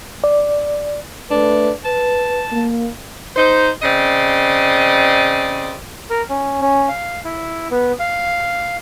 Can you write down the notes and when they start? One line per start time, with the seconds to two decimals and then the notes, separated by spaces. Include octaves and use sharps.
0.24 D5
1.30 A3 D4 A4 B4
1.84 B4 A5
2.52 A#3
3.36 D#4 C5
3.83 C#3 C4 D5 D#5
6.10 A#4
6.30 C#4
6.62 C#4
6.88 F5
7.25 E4
7.71 B3
8.00 F5